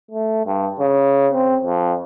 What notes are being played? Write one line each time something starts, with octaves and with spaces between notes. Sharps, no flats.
A3
G2
C#3
C4
F2